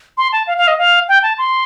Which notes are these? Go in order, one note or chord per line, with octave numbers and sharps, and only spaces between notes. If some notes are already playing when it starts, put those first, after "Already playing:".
C6
A5
F5
F5
D#5
F5
G5
A5
C6